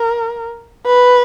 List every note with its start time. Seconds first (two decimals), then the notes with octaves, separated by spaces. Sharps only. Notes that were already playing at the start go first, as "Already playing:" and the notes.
Already playing: A#4
0.86 B4